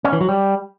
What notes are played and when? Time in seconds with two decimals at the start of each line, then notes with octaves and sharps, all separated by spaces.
0.05 C#4
0.13 E3
0.21 F#3
0.29 G3